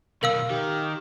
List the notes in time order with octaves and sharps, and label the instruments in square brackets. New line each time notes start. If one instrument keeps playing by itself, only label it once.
[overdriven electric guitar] B2 D#3 [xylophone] A#4 F5 E6
[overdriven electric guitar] D#3 [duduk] G4